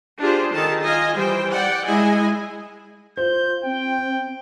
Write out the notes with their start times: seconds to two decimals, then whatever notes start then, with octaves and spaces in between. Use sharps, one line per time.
0.20 D4 F4 G4 G#4 C5
0.53 D#3 G#4 A4 A5
0.83 F4 D#5 G#5
1.16 E3 G3 C5 G5
1.53 D5 F#5 G5
1.86 G#3 E4 G#4 D#5 G#5
3.17 F4 C5 G6
3.65 C4 G5